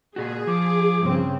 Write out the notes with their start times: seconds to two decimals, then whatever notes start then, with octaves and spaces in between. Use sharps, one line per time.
0.16 A#2 F#4 G#4
0.47 F3 D6
1.01 G2 C#3 C4